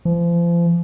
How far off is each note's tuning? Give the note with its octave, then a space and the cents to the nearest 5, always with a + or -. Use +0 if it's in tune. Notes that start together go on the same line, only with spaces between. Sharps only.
F3 -35